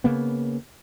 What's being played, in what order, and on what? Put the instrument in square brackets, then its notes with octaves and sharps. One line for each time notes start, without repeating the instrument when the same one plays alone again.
[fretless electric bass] C#3 A#3 B3